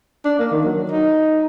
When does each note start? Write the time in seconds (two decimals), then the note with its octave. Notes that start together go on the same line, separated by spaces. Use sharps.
0.25 D4
0.39 A#3
0.52 D#3
0.65 F#3
0.91 D#4